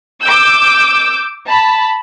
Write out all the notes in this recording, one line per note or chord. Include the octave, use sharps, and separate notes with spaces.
D6 E6 G6
A5 B5